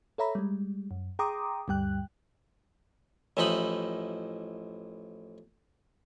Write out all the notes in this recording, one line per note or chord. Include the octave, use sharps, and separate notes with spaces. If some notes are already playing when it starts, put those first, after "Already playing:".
A4 C#5 E5 A#5 B5
G3 G#3
F#2
G#4 G5 A#5 C6 D6 D#6
D2 G2 G3 G5 F#6
A1 E3 F3 D#4 D#5 B5